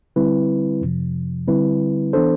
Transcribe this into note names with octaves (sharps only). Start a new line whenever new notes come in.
D3 G3 C4 E4 B4
F2 C3 F3
D3 G3 C4 E4 B4
E3 B3 D4 A4 C5